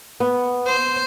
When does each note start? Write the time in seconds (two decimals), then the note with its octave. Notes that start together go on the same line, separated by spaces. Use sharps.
0.20 B3
0.66 C5